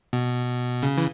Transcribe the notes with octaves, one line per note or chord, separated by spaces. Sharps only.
B2
C#3
E3